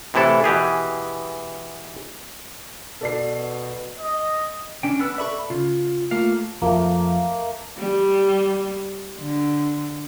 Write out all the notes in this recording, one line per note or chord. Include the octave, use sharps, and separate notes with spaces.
A2 C3 E3 E4 A4
B2 E3 G4 G#4
B2 A4 D5 C7
D#5
C#4 D4 G5
B3 B4 E6
A4 D5 E5 B5 C#6
C#3 F4
A3 A#3 F4 F5
F2 F3 A3 A#3
G3
D3